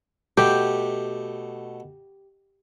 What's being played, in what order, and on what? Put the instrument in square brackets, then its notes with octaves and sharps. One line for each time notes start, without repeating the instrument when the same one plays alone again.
[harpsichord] B2 A3 [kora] G4